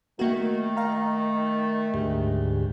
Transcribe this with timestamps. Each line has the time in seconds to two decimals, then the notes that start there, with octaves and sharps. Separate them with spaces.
0.19 D#3 A3 A#3 F#4
0.77 F5 A#5
1.94 D2 G#2 G4